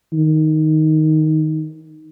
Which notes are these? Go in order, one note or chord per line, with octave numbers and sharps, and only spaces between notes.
D#3